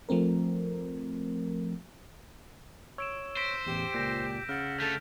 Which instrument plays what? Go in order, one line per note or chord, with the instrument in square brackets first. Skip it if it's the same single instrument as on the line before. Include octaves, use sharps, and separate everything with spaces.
[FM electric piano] F3 A3 C4 A#4
[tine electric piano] C#5 [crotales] E6 D7 E7
[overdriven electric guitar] C5 [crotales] A#6 B6 D7
[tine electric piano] A1 E2 [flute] G4
[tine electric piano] C#2 A#2 [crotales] G6 A#6 E7
[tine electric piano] C#3 [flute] F#5 [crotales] F6 A6
[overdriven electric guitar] D3 A3 [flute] A4 [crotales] G6 F7